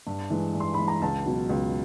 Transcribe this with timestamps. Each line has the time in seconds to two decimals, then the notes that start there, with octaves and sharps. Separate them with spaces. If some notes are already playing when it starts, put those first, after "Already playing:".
0.07 G2
0.30 E3 G#3
0.55 G2
0.60 C6
0.74 E3 G#3 B5
0.88 A#5
1.02 C#2 A5
1.25 B2 F#3
1.49 C#2